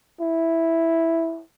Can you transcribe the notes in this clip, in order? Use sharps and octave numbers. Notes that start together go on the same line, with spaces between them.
E4